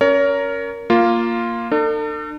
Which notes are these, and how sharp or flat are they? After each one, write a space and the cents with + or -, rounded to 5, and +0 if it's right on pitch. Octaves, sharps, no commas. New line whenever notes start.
C#4 +0 A#4 +0 C#5 +30
A#3 +0 F4 +0
D4 +45 A4 +40